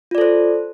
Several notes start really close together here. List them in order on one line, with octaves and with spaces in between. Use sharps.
F4 D5 A4 C5